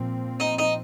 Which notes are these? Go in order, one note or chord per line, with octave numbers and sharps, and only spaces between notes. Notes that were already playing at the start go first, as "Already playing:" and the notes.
Already playing: A#2 F3 C4
D#4
D#4